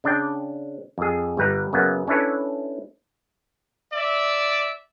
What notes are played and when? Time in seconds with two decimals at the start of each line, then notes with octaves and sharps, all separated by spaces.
0.04 C#3 D4 D5 G5
0.98 F2 G#4
1.37 G1 G3 B4 A#5
1.73 F#2 C#3 A#3 B3
2.08 C#4 D4 E4 A4 B4 C#5
3.93 D5 E5